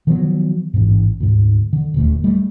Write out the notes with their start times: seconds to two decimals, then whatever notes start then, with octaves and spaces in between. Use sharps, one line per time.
0.07 D#3 F3 F#3 B3
0.74 A1 G#2
1.20 D2 G#2
1.73 D3
1.94 D#1 D2 A3
2.24 G3 A3